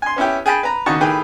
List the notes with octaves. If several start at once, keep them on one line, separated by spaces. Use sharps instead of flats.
G#5 C6
B3 C#4 E4 G4
G#4 G5 A5 B5
B4 A#5
D#2 C#3 F#4 D#5 A5 C#6
A2 D#3 G4 G#4 B4